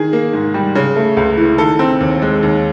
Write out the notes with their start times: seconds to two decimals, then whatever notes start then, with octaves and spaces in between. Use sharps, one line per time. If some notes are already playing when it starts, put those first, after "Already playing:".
Already playing: D#3 G#4
0.13 A#3
0.33 G#2
0.54 G3
0.75 C#3
0.96 A3
1.17 C#2
1.37 E3
1.58 D#3 A4
1.79 C4
2.00 D#2
2.22 G#3
2.43 D#2